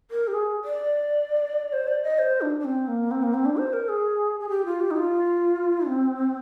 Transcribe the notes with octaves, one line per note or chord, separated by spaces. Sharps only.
A#4
G4
G#4
D5
C5
D5
D#5
C5
D4
D4
C4
A#3
C4
A#3
C4
D4
C5
A#4
G#4
G#4
G4
F4
G4
D#4
F4
C4